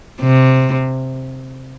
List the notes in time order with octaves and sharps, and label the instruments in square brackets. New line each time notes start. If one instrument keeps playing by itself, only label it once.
[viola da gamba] C3